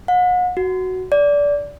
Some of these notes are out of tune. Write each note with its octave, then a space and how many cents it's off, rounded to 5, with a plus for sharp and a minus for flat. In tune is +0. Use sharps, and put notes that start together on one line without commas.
F#5 -40
F#4 +5
D5 -20